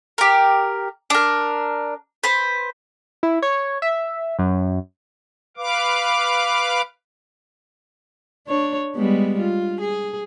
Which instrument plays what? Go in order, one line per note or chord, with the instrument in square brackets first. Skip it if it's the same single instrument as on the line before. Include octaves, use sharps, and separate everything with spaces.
[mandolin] G4 A#4
D4 A#4
B4 C5
[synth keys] E4
C#5
E5
F#2
[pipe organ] B4 F5 D6
[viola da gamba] D4 C#5
G3 G#3 B3
F4
G#4